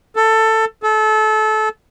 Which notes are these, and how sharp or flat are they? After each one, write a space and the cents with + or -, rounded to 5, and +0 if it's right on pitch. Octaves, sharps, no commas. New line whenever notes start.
A4 +15
A4 -25